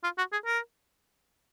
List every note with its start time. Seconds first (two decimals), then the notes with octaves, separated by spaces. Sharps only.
0.04 F4
0.18 F#4
0.32 G#4
0.46 A#4